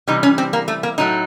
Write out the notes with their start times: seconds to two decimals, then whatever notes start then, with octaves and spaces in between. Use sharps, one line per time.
0.07 C3 E3 G3 D#4
0.23 C#4
0.38 C4
0.53 A#3
0.68 A3
0.83 A#3
0.98 A2 F#3 A3 D#4